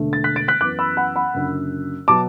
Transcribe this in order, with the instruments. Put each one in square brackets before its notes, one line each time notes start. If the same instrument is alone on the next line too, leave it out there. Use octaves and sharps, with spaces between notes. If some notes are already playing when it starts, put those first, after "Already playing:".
Already playing: [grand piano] E1 D2 D3 A3
A6
F#6 B6
A6 D7
F#6 B6
F#2 E3 B3 D6 F#6
B5 E6
F#5 B5
F#5 B5
F#1 F#2 D3
B2 F#3 A5 D6